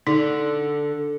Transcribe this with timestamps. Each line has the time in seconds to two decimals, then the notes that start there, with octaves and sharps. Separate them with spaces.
0.07 D3 D#4